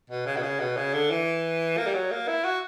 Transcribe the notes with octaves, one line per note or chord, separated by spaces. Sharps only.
B2
C#3
B2
C#3
B2
C#3
D3
E3
A#3
G3
F#3
A#3
E4
F#4